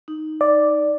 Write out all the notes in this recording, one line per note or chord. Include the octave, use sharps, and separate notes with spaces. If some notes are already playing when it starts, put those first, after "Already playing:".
D#4
D5